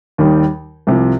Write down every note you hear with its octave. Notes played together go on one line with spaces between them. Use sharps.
D#2 D#3 G3
C2 C3 F3